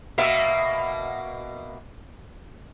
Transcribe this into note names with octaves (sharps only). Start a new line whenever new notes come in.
B2 A#3 E5